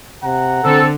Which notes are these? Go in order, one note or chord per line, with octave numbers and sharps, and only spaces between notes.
C3 F#5 A#5
D3 C4 A4